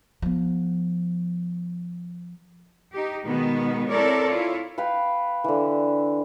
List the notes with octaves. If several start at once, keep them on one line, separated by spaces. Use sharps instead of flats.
F3 B3
D#4 G4
B2 D#3 G#3 B3
C4 E4 A4 A#4 C#5 D5
E4 F4 C#5
B4 F5 G5 B5
D3 E3